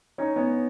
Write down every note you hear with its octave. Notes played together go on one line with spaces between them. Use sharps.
C#4 D#4
B3 C#4